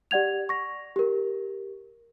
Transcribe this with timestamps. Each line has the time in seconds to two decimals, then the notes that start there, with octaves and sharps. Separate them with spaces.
0.11 G4 D5 F#5 G#6 F7
0.49 C#6 A#6
0.96 G4 A#4